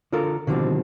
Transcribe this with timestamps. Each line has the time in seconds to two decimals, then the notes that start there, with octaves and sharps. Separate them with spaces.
0.12 D3 F4 A4 A#4
0.47 B2 D3 D#3 F3 G3 C4